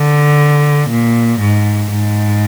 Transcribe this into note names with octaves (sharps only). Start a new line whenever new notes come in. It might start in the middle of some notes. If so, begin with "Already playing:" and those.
Already playing: D3
A#2
G#2
G#2